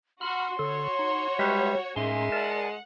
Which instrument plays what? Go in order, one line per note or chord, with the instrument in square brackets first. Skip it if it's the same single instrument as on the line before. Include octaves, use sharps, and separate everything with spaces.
[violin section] F#4 [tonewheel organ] B5 F6 [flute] C6
[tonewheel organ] D3 A4 [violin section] F#4 C#5
[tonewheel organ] D#4
[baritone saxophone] G3 [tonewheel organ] G#3 B4 E5
[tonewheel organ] A2 C#4 C6 [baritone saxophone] G#3 [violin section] A#3 D#4 G#4 [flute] E5
[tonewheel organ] A#4 D5 A5 [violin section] F#5